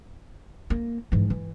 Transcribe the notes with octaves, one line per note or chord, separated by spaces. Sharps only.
A#3
G#2 E3
E3